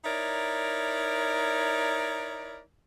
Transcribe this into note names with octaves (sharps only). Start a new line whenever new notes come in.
D#4 E4 A#4 C#5 D5